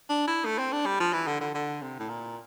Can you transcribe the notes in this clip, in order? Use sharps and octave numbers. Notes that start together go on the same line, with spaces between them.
D4
E4
A3
C4
D4
G3
F3
E3
D3
D3
D3
C3
A2
A#2